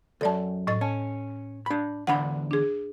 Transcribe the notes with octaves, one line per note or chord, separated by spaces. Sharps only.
C#2 F#2 A4 D5 A5
A2 D#5 A6
C#4 A5
D4 B5
E2 D3 D4 F#5 B5
D4 G#4